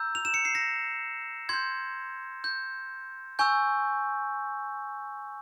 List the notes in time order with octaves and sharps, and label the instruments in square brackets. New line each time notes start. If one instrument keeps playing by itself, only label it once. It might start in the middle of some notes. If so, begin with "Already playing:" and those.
Already playing: [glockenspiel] A#5 E6 G6
F7
E7
C#7
C7
A#6
C6 G6 G#6
G6
G#5 C#6 E6 G6